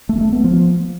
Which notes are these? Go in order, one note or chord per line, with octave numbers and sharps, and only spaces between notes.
A3
A3
B3
F3